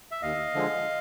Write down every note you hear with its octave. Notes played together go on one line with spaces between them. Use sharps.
E5
D#2 D#5 F5
D3 F3 G#3